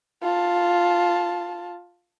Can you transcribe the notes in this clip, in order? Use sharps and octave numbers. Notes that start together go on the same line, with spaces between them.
F4 A5